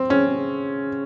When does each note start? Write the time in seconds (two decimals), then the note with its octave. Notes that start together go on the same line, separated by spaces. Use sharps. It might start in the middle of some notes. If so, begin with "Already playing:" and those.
Already playing: C4
0.10 C#3 C#4
0.27 C3
0.37 C#3